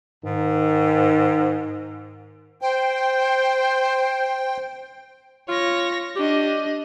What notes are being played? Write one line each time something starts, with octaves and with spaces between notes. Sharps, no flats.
G#2 D#3
C5 G5
F4 C#5 A#6
D4 G4 D#5